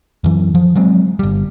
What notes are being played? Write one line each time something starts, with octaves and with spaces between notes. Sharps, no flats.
F#2 E3
F3
F#3 G#3 C4
G1 G3